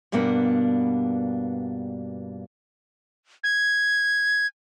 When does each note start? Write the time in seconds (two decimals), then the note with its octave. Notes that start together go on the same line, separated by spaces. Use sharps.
0.12 G2 B2 G3 A#3 B3 D4
3.44 G#6